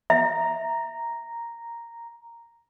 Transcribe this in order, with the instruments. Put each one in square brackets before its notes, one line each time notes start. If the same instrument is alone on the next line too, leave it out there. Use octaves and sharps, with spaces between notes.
[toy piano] E5 [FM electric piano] A#5